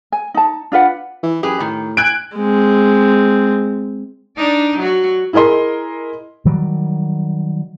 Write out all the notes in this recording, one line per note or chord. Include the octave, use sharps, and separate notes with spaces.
G#5
D#4 A5
D4 F4 B4 F#5
E3
F#2 G4 G#4 B4
A2 D#3
G#5 F#6 D7
G#3 C4
D4 D#4 D5
F#3 F#4
E4 G#4 A#4 D#5 C6
D#3 F#3 G3